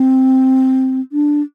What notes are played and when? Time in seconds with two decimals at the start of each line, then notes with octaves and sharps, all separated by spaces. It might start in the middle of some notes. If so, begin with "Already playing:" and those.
Already playing: C4
1.12 D4